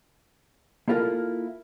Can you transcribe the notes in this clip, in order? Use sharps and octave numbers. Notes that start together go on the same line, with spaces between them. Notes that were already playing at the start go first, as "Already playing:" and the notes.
A#3 E4 F4 G4 A4 A#4